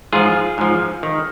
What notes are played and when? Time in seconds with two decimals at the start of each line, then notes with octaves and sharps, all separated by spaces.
0.13 G#2 F3 F4 G#4
0.58 G#2 F3
1.03 D#3